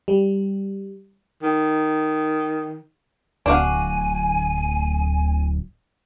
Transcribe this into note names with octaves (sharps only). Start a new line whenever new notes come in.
G3
D#3
D1 D4 F#4 F5 G#5